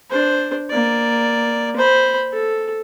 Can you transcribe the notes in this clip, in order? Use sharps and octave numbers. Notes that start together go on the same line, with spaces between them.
D4 C5
A#3 D5
C5 B5
A4